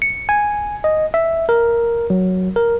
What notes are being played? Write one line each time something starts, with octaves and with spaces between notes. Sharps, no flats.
C#7
G#5
D#5
E5
A#4
F#3
A#4